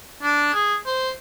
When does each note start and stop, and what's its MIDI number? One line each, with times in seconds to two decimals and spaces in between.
0.23 0.48 62
0.54 0.75 68
0.86 1.11 72